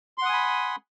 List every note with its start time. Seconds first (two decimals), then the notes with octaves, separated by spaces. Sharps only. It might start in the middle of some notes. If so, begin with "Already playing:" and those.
0.18 C6
0.22 F#5
0.25 D#6
0.29 G#5
0.33 B5